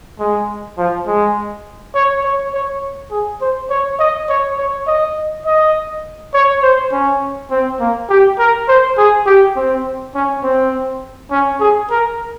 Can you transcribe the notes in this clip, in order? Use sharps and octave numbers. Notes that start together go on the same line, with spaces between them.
G#3
F3
G#3
C#5
C#5
C#5
G#4
C5
C#5
D#5
C#5
C#5
D#5
D#5
C#5
C5
C#4
C4
A#3
G4
A#4
C5
G#4
G4
C4
C#4
C4
C#4
G#4
A#4